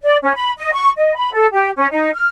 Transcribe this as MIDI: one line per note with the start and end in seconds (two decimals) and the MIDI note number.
0.02 0.16 74
0.22 0.32 61
0.34 0.51 83
0.57 0.71 75
0.72 0.90 85
0.97 1.14 75
1.15 1.30 83
1.33 1.46 69
1.52 1.70 67
1.76 1.86 61
1.90 2.09 63
2.13 2.29 89